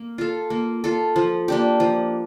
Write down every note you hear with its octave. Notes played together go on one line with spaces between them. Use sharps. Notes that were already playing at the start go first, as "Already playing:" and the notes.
Already playing: A#3
F4 A4
A#3
F4 A4
F3
A#3 D4 G4
F3